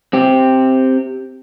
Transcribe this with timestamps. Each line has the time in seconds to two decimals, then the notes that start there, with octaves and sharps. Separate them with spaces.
0.13 C4 G4